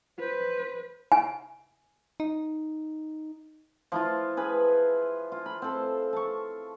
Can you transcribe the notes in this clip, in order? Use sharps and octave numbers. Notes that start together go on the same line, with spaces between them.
B4 C5
G#5
D#4
F3 E4 F4
G#4 B4 B5
F4
B5
C4 A4
A5 C#6